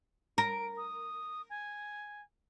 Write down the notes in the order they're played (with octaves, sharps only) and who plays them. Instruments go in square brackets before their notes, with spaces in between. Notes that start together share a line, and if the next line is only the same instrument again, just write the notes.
[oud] A#4 [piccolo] D7
[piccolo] D#6
G#5